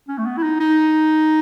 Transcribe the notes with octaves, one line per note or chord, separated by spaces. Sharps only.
C#4
A3
B3
E4
D#4
D#4